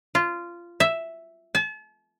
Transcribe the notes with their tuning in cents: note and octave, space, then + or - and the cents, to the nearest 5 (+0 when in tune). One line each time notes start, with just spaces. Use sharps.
F4 -15
E5 +0
A5 -40